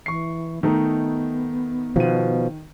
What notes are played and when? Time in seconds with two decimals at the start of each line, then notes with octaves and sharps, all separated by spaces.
0.06 E3 C#6 C7
0.63 D#3 A3 B3 D#4
1.96 B2 D#3 F3 D#7